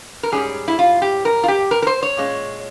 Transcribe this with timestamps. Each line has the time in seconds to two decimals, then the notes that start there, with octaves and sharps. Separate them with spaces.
0.23 A#4
0.32 G#2 G3 C#4 G#4
0.68 E4
0.79 F4
1.02 G4
1.25 A#4
1.44 F4
1.48 G4
1.71 A#4
1.82 A#4
1.87 C5
2.03 C#5
2.17 A#2 G#3 C#4